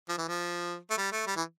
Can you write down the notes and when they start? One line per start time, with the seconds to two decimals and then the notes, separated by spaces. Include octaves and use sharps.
0.09 F3
0.18 E3
0.28 F3
0.90 A3
0.97 G3
1.12 A3
1.27 G3
1.36 E3